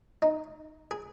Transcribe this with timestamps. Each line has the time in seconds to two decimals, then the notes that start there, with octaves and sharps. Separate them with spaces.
0.22 D#4
0.91 G#4